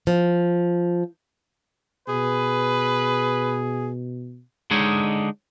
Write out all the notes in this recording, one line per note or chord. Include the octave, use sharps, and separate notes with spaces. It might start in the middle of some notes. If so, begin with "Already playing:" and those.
F3
B2 G#4 B4
D3 G#3 D#4 C#5